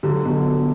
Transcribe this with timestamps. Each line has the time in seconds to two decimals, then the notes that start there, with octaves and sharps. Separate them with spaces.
0.03 D3 F#3
0.25 B2 D3